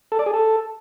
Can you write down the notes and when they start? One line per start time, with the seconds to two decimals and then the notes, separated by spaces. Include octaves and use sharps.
0.12 A4
0.19 D5
0.26 G#4
0.34 A4